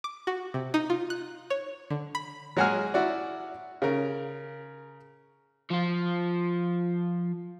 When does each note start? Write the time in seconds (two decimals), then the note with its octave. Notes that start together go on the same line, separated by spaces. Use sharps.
0.04 D6
0.27 F#4
0.54 C3
0.74 D#4
0.90 F4
1.10 F#6
1.50 C#5
1.90 D3
2.15 B5
2.57 F#3 G#3 F#4 G#4 G#5 F6
2.94 E4 F#4 D5
3.82 C#3 A#4
5.71 F3 F4